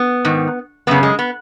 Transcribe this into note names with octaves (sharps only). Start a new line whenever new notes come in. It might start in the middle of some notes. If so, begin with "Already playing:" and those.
Already playing: B3
G#2 D#3
F#2 C#3 B3
G#3
B3